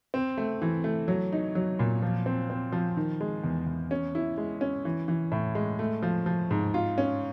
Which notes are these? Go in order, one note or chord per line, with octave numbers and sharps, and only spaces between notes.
C4
A3
E3
A3
F#3
D#4
F#3
A#2
F3
C4
C4
F3
D#3
G#3
E2
E2
C#4
E4
G#3
C#4
E3
E3
A2
G#3
A3
F3
F3
G#2
F4
C#4